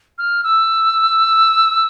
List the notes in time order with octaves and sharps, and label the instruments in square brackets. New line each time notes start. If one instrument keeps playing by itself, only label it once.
[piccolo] F6
E6